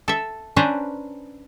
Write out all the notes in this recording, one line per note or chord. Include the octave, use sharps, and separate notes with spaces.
A4 E5
C#4 D4 B4 C5 G#5 A#5